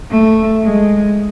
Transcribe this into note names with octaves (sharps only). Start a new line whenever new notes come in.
A3
G#3